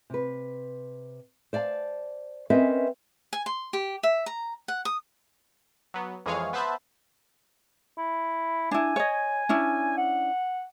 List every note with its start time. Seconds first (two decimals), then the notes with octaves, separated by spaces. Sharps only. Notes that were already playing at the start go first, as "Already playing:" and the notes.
0.10 C3 B4
1.53 C5 D5 F5 A5
2.50 C4 C#4 A#4 B4 D#5 E5
3.33 G#5
3.46 C6
3.73 G4
4.03 E5
4.26 A#5
4.68 F#5
4.85 D#6
5.94 F#3 B3
6.26 F2 E3 G#3 G#4 C#5 F5
6.53 B3 B4 C5 E5 A5 B5
7.97 E4
8.71 D4 E4 G#5
8.96 C#5 D#5
9.49 C#4 D4 E4
9.97 F#5